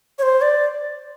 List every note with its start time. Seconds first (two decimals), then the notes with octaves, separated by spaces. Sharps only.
0.18 C#5
0.22 C5
0.41 D5